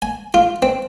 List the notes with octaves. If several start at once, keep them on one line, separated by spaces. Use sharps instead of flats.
G#5
F4
C4